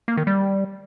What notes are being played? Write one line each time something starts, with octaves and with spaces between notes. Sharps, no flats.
A#3
D#3
G3